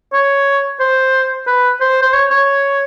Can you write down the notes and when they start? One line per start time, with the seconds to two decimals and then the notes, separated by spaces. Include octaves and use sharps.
0.13 C#5
0.80 C5
1.46 B4
1.80 C5
2.02 C5
2.13 C#5
2.30 C#5